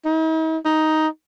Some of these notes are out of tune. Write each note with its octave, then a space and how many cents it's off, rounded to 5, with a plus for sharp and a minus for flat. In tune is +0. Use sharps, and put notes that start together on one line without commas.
D#4 +45
D#4 +5